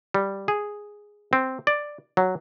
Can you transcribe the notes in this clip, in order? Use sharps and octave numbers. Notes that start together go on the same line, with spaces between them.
G3
G#4
C4
D5
F#3